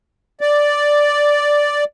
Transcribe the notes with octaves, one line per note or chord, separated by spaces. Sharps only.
D5